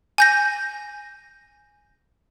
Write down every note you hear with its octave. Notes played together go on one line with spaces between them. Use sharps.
G#5 G6 A#6